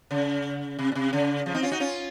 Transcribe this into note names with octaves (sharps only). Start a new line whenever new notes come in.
C#3
C3
A#2
C3
C#3
C#3 F3
C4 D#4
C#4 F4
D#4 F#4
C#4 F4